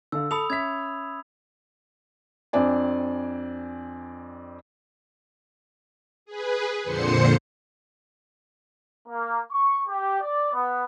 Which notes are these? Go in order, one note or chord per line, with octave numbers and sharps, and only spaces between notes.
D3 A4 F5 E6
A4 B5 D#6 C#7 F7
C#4 E5 G#6 B6
F2 C4 D4 D5 G#5
G#4 B4
F2 A#2 D3 C5 C6 C#7
A#3
C#6
G4
D5
B3